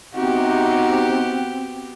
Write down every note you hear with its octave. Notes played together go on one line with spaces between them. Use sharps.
C3 B3 C4 D#4 F#4 G4